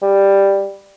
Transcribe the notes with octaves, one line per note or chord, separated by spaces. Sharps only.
G3